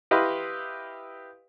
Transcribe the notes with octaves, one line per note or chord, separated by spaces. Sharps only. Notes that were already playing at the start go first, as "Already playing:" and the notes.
E4 G4 B4 D#5 F5 C6